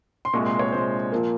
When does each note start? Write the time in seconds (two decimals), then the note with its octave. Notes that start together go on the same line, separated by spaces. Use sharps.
0.25 C6
0.33 C2 A#2 G#3 C#6
0.46 C6
0.59 C#5
0.72 C2 A#2 G#3 C5
1.12 A#2 F3 A#3